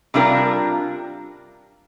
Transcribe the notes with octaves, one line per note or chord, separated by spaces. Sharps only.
C3 G3 D4 F4 A#4